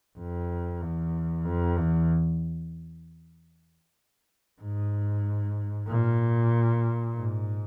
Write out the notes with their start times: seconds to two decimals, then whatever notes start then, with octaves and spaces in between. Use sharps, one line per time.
0.18 F2
0.81 E2
1.45 F2
1.76 E2
4.61 G#2
5.88 A#2
7.15 G#2